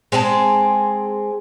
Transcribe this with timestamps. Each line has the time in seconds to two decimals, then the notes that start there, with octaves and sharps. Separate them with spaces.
0.12 G#3 C4 G#4 A5